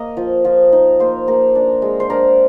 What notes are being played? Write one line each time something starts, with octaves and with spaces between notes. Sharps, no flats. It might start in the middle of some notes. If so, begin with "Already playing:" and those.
Already playing: A#3 D#5
F3
F3
D#4
A#3 C5
A#3 A#4
D4
G#3
C5
D4 A#4